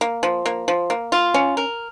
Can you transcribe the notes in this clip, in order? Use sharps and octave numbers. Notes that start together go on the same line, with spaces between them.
A#3
F3
A#3
F3
A#3
F4
C#4
A#4